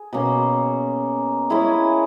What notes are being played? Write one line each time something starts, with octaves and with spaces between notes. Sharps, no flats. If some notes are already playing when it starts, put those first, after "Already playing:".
Already playing: G#4
B2 A#3 C#4
G#3 C#4 E4 G#4